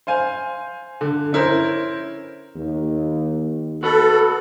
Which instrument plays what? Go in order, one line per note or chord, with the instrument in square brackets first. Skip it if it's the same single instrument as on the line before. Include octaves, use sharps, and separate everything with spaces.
[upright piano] C5 F5 G#5
D3
C#4 E4 A#4 C5
[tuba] D#2
[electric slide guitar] F#4 B4 [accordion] A4